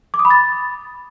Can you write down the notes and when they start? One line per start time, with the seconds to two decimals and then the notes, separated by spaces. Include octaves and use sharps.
0.14 D6
0.19 D#6
0.25 B5
0.30 A6